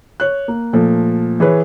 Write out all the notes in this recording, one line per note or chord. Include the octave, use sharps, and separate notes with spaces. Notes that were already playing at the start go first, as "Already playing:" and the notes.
C#5 F#6
A#3
A#2 F3 A3
E3 G#4 B4 C#5